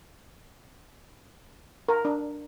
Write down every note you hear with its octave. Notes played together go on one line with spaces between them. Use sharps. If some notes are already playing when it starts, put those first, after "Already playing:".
A#4
D4